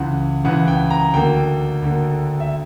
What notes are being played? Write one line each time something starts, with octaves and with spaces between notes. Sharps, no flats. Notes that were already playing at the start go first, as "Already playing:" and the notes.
Already playing: C#2 C#3 E3 F#5
C#2 C#3 E3 F#5
G5
A#5
D2 D3 A#3 G5
D2 D3 A#3
E5